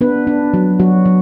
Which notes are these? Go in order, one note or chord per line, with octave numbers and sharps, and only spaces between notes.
B3 D4 B4
D4
F#3
F#3 F#4
F#3